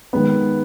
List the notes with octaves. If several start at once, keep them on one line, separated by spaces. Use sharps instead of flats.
D#3 G#3 B3